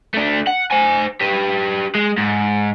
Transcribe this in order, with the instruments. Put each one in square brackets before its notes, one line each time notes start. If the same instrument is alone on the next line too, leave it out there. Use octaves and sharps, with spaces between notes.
[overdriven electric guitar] A3 D4
F#5
C5 G#5
G4 B4
G#3
G#2